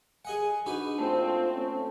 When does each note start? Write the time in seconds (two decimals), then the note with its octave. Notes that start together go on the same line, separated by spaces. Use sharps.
0.25 G#4 D#5 F#5 G#5
0.66 G#2 D4 D#4 F#4 B4
0.98 A#2 A3 C4 F4 A5
1.54 A3 C#4